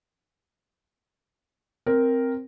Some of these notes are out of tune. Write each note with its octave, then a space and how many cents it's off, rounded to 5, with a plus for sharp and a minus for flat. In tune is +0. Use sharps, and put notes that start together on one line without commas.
C4 +0 A#4 +0